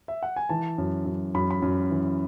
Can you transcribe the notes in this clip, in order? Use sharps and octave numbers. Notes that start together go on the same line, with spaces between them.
E5
F#5
G#5
E3 A5
F#2
F#2
F#2 B5
B5
F#2
E3